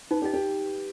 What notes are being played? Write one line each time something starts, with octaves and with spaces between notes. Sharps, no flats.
D#4 B4
G4
D#5
G4